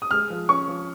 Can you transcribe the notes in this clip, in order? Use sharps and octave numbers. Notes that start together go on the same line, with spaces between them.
D#6
G#3 F6
F3
C#4 C#6
F3